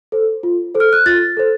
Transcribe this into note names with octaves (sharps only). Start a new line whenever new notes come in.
A4 C5
F4
A4 C5
F6
F#6
F4 A6
A4 C5